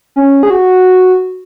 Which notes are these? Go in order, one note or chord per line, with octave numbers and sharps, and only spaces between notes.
C#4
G#4
F#4